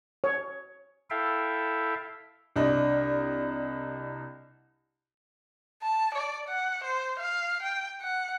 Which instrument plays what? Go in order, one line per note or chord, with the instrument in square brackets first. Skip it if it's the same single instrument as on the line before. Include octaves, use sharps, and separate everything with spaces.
[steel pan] C#5
[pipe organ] E4 A4 E5 F5 G5
[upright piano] C2 D4 D#5
[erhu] A5
D5
F#5
C5
F5
G5
F#5